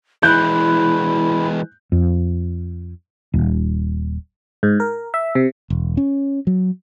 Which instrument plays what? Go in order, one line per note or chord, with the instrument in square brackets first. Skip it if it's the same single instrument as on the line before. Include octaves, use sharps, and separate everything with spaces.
[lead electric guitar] E3 G#3 [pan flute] E4 [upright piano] F#6 G6
[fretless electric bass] F2
D#1
[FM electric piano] G#2
A#4
E5
C3
[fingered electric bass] E1
C#4
F#3